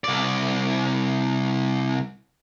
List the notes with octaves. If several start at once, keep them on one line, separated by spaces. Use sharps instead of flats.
C2 D5